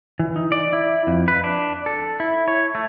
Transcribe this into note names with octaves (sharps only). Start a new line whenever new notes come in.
E3
D#4
D5
E4
F2
B4
D4
A4
E4
C#5
A3